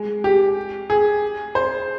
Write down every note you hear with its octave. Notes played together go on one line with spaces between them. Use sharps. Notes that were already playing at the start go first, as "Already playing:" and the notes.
Already playing: G#3
G4
G#4
C5